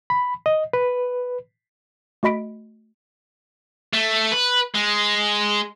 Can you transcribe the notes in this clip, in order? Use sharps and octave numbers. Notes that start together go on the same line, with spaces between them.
B5
D#5
B4
A3 F#4 D#5 B5 B6 D7
A3
B4
G#3